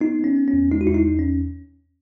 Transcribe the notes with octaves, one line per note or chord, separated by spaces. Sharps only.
B3 D#4
B3
C#4
B3
C#4
E2
G#3 D#4
F#4
E2 E4
D#4
E2
C#4